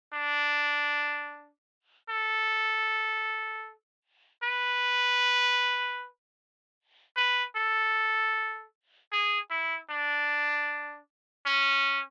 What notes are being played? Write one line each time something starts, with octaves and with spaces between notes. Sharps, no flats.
D4
A4
B4
B4
A4
G#4
E4
D4
C#4